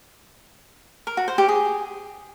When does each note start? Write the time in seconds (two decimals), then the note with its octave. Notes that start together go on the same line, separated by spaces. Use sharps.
1.07 A#4
1.17 F#4
1.28 C5
1.38 G4
1.48 G#4